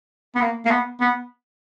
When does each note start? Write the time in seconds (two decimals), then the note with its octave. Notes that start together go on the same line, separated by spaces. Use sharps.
0.35 B3
0.42 A#3
0.65 A#3
0.70 B3
1.01 B3